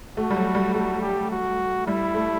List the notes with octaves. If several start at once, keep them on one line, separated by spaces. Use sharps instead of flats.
A3 F#4
G3
F#3
G3
A3 F#4
G4
F#4
G3 E4
A3